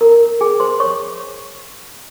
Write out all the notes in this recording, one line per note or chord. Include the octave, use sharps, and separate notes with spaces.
A#4 A#5
G#4 G#5
C5 C6
C#5 C#6